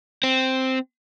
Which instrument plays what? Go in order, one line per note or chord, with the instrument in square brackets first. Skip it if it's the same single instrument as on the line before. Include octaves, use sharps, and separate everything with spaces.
[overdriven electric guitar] C4